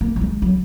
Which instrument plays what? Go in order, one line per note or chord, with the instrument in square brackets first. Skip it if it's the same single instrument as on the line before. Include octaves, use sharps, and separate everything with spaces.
[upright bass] A#3
F#3
G#3
F#3